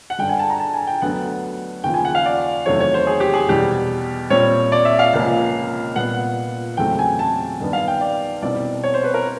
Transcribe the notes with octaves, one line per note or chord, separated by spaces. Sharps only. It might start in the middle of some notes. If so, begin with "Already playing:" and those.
F#5
G2 D3 G3 G5
G#5
A5
A#5
A5
G#5
G5
D2 D3 F#3 B3 F#5
D#2 C#3 F3 G5
G#5
F#5
F5
D5
E2 C3 D#3 F#3 A3 C#5
C#5
C5
G#4
G4
G#4
E2 B2 G3 G4
A#2 G3 C4 C#5
D5
E5
F5
C#2 C3 F3 A#3 C#4
A#2 G3 B3 F#5
E2 C#3 F#3 A3 C4 G5
G#5
A5
G2 D#3 G3 B3
F5
G5
D5
C2 B2 G3 C4 D5
C#5
C5
B4
A#4